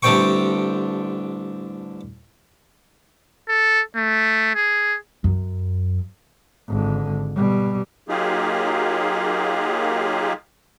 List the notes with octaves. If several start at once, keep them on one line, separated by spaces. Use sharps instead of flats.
A1 D3 G3 C4 G5 C#6
A4
A3
G#4
F#2
G#1 D3
B2 G3
F#3 A#3 D#4 F4 G4 G#4